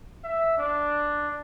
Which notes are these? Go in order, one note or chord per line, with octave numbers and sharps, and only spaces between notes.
E5
D4